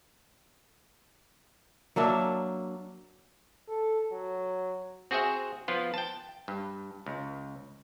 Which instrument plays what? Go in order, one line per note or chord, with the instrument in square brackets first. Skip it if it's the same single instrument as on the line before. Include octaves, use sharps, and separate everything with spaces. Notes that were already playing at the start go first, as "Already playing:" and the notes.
[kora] F#3 A#3 D4 E5
[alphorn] A4
F#3
[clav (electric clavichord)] C4 F#4 G#4 C5 E5 F#5
F3 B3 F4
G5 A5
G2
C#2